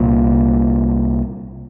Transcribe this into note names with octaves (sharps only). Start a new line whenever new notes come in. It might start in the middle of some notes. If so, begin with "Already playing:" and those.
Already playing: C2 A#2